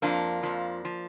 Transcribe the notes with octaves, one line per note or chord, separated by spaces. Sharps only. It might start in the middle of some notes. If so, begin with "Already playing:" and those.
F2 F3 A#3 D4
F2 F3
F3